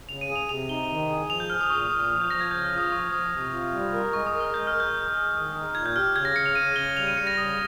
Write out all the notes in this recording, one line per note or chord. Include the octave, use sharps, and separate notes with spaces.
C#3 F7
D#7
G#4
F7
C3 F7
D#4 G7
D#3
G#4
F3 F7
G6
G#4 F6
D#6
A#2 C#6
A#2 D#6
F3 D#6
G6
F3 A#6
G#6
C#3 G6
F6
F4
D#6
F3 C#6
F3 D#6
C3
F4
G3
A#4
G#3 C#6
D#6
A#4
F6
G#3 G6
F6
A#4
G6
G#3 G6
G#4
D#3
D#4
A#2 G#6
G6
G4 F6
C#3 G#6
A#6
C#3 C#7
F7
C#3 D#7
C#3 G7
G3 F7
D#7
G3 C#7
A#6
C#3 D#6